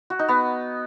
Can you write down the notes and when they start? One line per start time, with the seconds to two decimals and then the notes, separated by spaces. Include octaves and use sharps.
0.10 F#4
0.19 D#4
0.28 B3